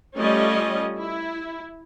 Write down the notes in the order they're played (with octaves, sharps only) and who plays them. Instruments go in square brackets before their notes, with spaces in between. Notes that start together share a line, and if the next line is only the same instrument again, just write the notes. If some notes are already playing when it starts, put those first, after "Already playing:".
[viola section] G3 A3 C#4 F4 D#5
E4